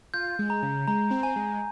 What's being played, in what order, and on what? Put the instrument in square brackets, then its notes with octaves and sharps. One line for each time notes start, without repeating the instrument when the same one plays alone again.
[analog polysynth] F4 [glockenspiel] G6
[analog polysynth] G#3
[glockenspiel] A#5
[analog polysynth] C#3
[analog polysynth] G#3 [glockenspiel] A#5
[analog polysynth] C4
[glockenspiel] G#5
[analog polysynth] G#3